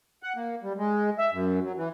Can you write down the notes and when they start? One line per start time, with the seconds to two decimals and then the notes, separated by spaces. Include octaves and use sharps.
0.23 F#5
0.36 A#3
0.63 G3
0.77 G#3
1.18 E5
1.32 F#2
1.65 F#3
1.77 E3